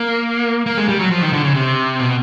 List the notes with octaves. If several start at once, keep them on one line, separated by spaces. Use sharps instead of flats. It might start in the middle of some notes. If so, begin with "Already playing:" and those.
Already playing: A#3
A#3
G#3
G3
F#3
F3
D#3
D3
C#3
C3
B2